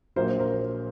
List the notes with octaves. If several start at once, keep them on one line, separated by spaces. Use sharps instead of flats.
A#1 A#2 F#3 A#4 C5
A#4 C5